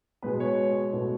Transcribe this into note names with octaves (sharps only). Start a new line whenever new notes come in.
B2 G#3 B3 B4
C#5
B2 A3